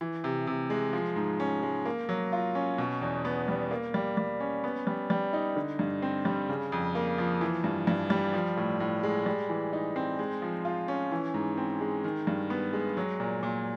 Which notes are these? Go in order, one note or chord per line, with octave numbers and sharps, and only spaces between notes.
E3
C3
C3
G#3
F3
G#2
C#4
G#3
A#3
F#3
F4
C#4
B2
E2
B3
G3
A#3
G3
G3
C#4
B3
G3
G3
D#4
D3
G2
C4
G3
C#3
F2
A#3
F3
E3
G2
G2
G3
F3
A2
A2
G#3
G3
E3
D#4
C4
G#3
F3
F4
C#4
E3
G#2
C4
G#3
D#3
G2
B3
G#3
F#3
A#2
A#2